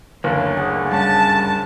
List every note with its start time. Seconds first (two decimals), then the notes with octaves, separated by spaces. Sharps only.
0.24 F#1 D2 A#3 C#5
0.57 G#4 D5 F#5
0.92 G2 C#4 A5